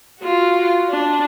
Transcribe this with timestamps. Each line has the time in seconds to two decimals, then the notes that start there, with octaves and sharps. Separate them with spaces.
0.20 F4 F#4
0.90 D4